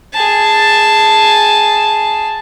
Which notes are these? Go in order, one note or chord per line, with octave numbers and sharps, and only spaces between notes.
G#4 A5